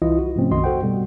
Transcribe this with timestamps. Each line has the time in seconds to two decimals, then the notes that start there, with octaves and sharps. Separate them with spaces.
0.02 C2 E3 E4 F4 D#5
0.18 F#4
0.36 G#2 C3 F3 A3 C4 C#4
0.51 B1 F#2 D#3 F#4 D#5 C6
0.64 F#4 A4 C5 F#5 G5
0.83 B2 G3